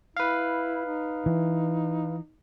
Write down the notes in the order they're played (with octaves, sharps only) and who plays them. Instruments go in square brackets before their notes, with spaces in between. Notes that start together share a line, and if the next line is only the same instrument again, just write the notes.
[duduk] E4 [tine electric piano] B4 F5
[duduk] D#4
[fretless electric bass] E3